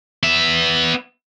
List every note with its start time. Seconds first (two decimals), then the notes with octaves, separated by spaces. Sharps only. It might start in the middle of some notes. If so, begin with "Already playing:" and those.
0.23 B3 E5